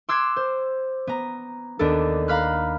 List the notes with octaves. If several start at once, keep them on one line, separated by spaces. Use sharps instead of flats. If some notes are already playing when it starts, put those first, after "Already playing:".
C6 D6 E6 F#6 G#6 C7
C5
B3 A#5
D#2 B3 D4 A4
F5 A#5 B5 F6 F#6